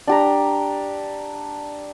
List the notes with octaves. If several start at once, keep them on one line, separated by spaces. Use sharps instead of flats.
D4 G4 A#5